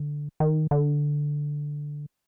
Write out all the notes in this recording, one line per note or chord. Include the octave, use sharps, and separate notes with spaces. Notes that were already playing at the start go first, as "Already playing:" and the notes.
Already playing: D3
D#3
D3